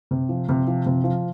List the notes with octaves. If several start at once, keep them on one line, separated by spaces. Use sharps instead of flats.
C3
F3
C3
F3
C3
F3